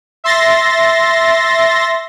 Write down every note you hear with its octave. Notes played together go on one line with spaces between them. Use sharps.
E5 C6 A6 A#6